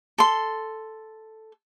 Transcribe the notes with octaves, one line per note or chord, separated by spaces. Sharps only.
A4 C6